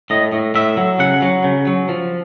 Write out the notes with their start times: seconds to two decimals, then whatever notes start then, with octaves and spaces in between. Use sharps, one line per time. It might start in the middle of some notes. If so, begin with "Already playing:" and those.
0.10 A2 D#5
0.32 A2
0.55 A2 E5
0.77 F#3
0.99 C#3 F#5
1.22 F#3
1.44 C#3
1.67 F#3
1.89 F3